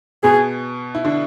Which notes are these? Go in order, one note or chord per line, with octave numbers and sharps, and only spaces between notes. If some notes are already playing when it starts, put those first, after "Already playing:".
B2 B3 G#4
E4
D3 D4